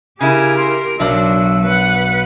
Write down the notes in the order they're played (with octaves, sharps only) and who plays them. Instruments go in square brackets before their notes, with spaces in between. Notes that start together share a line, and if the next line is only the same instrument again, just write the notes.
[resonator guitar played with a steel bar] C#3 E4 [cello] G4 A#4 [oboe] G#5
[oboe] C6
[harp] B1 [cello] F#3 [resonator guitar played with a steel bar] D4 A#4 D5 [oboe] E5
[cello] B4 F#5